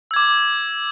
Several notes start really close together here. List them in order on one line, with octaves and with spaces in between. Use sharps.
E6 G#6 D6